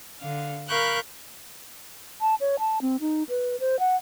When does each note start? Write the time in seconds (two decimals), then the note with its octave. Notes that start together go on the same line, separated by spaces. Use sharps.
0.18 D3 F5
0.68 A#4 F5 B5 C#6 F#6 G6
2.21 A5
2.41 C#5
2.59 A5
2.82 C4
3.01 D#4
3.29 B4
3.60 C5
3.79 F#5